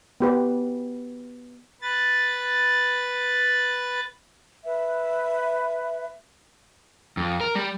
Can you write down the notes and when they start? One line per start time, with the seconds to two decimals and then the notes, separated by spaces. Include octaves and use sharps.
0.20 B3 G4 B4
1.82 B4 A6
4.64 B4 E5
7.17 F2
7.41 A#4
7.55 G3